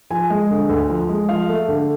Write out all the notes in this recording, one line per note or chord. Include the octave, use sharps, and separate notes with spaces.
F3 G#5
G#3
D3
D2
F3
G#3
F3 F5
A3
D3